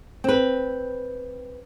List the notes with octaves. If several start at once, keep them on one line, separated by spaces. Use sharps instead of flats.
C4 B4